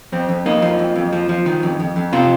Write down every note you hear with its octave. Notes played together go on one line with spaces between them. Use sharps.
F2 C4
F2
F2 A#3 D#4
F3
F2
F2
F3
F3
D#3
F2
F2
F2
C3 C4 F4